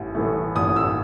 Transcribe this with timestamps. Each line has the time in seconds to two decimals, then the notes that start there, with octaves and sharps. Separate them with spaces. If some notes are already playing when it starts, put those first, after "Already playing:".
Already playing: A1 A2 E3 A3
0.15 A2 E3 A3
0.56 A1 D#6
0.76 E6